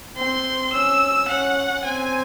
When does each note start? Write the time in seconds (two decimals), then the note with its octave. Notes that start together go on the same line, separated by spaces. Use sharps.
0.17 C4 C6
0.73 C#4 E6
1.29 C#4 F#5
1.85 C4 G#5